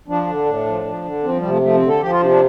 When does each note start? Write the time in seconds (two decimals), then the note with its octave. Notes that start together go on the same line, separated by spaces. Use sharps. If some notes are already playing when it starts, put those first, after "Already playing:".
0.08 F3 D4
0.27 D3
0.46 A2
0.66 F3
0.85 F3
1.04 D3
1.24 F3 C4
1.37 G3
1.43 C3
1.50 A3
1.62 F3 A3
1.75 C4
1.81 D3
1.88 A4
2.01 F3 G4
2.11 F4
2.20 C3 D4
2.30 D4